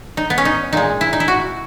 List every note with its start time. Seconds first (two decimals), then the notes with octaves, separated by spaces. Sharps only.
0.17 D#4
0.30 B3
0.38 C#4
0.45 D#4
0.73 A#2 G#3 D#4
1.01 E4
1.13 D#4
1.20 E4
1.28 F#4